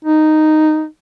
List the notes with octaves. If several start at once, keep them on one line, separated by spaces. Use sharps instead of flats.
D#4